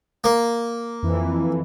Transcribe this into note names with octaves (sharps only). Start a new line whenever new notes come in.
A#3
F2 E3